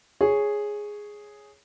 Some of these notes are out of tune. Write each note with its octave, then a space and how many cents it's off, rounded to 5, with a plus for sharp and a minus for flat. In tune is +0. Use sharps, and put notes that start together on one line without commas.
G#4 +0 C#5 +0